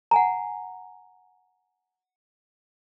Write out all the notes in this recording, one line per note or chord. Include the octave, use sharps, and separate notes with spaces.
F#5 G#5 A#5